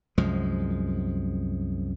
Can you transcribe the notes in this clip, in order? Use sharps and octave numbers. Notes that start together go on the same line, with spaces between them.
C2 F#2 F3 G#3